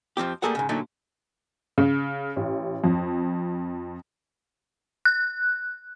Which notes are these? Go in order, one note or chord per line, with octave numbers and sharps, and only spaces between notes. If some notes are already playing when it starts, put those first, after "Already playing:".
F2 F3 C4 G4
G3 A3 A#3 G#4 A4 F#5
G#2 C#3
A#2 D3 F#3 A3 D#4
C#3
A1
F2
F#6